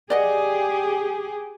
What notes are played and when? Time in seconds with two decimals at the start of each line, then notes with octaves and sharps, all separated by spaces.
0.10 G4 G#4 D5 D#5 F#5